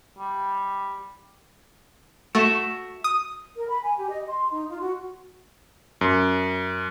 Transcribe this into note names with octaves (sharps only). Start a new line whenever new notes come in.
G3
A3 F#4 E5
D#6
A#4
B5
G#5
G4
D#5
C6
D#4
F4
F#4
F#2